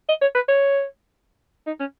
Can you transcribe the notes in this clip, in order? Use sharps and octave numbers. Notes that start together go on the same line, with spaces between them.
D#5
C#5
B4
C#5
D#4
C#4